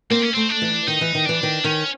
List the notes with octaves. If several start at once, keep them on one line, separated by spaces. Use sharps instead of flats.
A#3 C4
C#4
A3 C4
D4
E3
D#3 D#4
E3
D#3
E3 D4
D#3
D#3 C#4